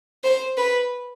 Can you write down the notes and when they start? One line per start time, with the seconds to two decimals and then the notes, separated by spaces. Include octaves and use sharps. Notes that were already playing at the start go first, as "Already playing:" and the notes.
0.24 C5
0.57 B4